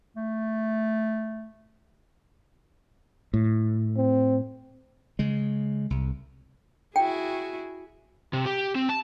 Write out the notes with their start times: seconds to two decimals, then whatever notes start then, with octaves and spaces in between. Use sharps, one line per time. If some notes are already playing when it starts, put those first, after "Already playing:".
0.16 A3
3.34 A2
3.97 C4
5.19 C#3 G#3
5.90 C2
6.96 E4 F#4 G#4 G5
8.33 C3
8.46 G4
8.75 C4
8.89 A5